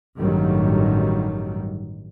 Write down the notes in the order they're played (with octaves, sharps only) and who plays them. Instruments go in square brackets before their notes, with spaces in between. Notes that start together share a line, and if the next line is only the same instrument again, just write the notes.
[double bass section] A1 G2 D#3 F#3 G3